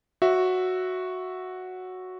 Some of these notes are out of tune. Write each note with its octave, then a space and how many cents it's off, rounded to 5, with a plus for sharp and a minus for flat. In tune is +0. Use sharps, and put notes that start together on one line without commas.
F#4 -5 C#5 +0 E5 +0